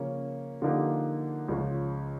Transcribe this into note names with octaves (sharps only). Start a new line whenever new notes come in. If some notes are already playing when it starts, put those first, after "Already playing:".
Already playing: C#3 F3 A#3 C#4
D3 F3 A#3 D#4 G4
C#2 C#3 F3